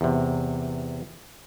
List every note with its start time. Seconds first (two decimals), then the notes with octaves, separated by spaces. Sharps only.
0.01 E2 C3